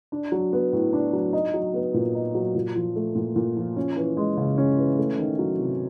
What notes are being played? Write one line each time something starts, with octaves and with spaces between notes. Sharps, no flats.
D4
F#3
B3
A2
D4
F#3
D#4
F#3
B3
A#2
D#4
F#3
A#2
F3
A3
A#2
A#2
F3
C#4
E3
G#3
C#3
C#4
E3
A3
D#3
F#3
C3